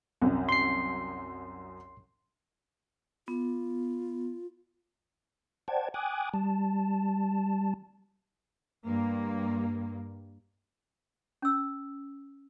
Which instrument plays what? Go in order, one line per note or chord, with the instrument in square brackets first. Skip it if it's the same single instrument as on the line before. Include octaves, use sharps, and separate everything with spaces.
[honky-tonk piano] C2 F#2
[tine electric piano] C6 C7
[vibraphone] B3 [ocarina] F4
[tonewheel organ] C5 D5 F#5 G5 A5 G#6
G5 G#5 D6 D#6 F#6 G#6
G3 A5
[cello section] G2 A#3
[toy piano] C#4 E6